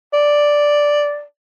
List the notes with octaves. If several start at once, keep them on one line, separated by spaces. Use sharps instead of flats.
D5